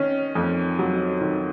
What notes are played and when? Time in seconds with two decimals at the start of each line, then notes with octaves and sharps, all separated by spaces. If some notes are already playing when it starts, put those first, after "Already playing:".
Already playing: D#3 C#4
0.35 F2
0.79 F#3
1.21 D#3